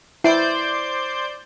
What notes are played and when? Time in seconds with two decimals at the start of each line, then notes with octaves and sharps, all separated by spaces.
0.24 E4 C5 D5 G6